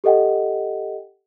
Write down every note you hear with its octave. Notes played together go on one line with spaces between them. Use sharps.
G4 A4 D#5 F#5 G5